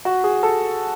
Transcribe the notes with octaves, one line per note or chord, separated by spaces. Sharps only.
F#4
G#4
A4